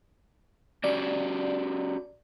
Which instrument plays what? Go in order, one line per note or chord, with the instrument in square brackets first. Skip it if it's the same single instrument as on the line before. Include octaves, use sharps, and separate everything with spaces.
[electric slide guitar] C#4 F#4 G4 [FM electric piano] D5